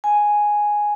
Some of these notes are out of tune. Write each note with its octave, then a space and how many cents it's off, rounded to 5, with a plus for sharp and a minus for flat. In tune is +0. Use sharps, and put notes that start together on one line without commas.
G#5 +0